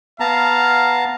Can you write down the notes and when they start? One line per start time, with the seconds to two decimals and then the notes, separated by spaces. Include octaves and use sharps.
0.20 B3 F5 A5 A#5